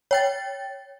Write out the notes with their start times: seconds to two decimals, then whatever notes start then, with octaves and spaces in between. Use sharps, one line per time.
0.11 C#5 G5 A6